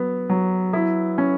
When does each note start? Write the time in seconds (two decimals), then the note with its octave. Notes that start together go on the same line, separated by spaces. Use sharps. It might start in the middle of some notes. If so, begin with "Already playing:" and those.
Already playing: F#3 B3
0.30 F#3
0.73 E4
1.18 C#4